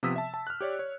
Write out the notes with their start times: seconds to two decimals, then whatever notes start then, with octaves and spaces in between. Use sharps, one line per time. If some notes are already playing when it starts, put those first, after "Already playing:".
0.03 C3 F3 B3 D#6 E6 B6
0.16 E5 A5
0.34 A5
0.47 F6 F#6
0.61 G4 C#5 D5
0.79 C#5